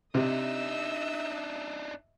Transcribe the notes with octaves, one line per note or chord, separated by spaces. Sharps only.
C3 D4 D#4 D#5 E5 E6